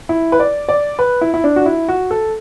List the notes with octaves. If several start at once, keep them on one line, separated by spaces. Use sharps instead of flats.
E4
B4
D5
D5
B4
E4
E4
D4
F#4
E4
F#4
A4